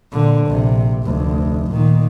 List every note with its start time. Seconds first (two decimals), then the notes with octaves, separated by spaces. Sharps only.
0.12 A#2 D3
0.47 A#1 C3
1.03 F1 D2
1.71 A#2 D#3